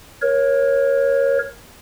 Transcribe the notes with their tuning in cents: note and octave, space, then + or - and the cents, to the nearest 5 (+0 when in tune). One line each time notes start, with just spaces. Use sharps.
A#4 +20 C#5 -10